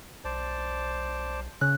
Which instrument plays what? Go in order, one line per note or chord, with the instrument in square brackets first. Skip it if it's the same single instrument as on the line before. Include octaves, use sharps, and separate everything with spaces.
[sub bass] B1 [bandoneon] C5 D5 A5
[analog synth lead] C#3 [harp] F#6